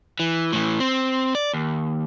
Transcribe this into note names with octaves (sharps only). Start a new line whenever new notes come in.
E3
A2 E3
C4
D5
D#2